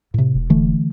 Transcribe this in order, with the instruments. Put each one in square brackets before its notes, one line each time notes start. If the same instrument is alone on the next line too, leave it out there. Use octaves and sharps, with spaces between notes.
[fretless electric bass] A2 C3
[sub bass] E1
[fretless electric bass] D3 E3 A3